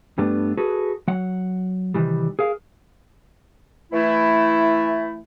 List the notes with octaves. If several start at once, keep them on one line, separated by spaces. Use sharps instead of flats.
G2 G3 A3 B3 D4
F#4 G#4 A4 B4
F#3 F#5
C3 D#3 E3 G3
G#4 A#4 F5
E3 A3 E4